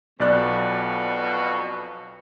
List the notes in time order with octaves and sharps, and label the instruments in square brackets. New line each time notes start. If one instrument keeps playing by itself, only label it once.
[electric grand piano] B1 D5 F#6 [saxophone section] F2 B2